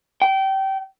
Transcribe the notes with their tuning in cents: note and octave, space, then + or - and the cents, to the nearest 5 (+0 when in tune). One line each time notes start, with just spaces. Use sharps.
G5 -25